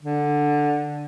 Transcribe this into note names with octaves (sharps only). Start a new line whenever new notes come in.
D3